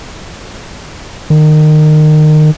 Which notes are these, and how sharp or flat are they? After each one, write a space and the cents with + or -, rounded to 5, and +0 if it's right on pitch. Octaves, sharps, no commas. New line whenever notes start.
D#3 -25